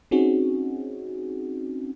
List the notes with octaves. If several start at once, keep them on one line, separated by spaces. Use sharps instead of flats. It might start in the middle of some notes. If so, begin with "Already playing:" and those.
C4 C#4 D#4 F#4 G#4